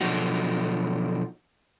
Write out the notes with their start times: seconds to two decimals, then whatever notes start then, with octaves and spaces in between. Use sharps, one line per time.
0.01 B2 D3 F3 F#3 D#4 F#4